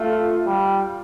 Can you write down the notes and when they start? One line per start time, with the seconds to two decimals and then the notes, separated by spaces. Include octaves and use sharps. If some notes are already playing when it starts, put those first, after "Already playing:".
Already playing: A3 F4
0.46 G3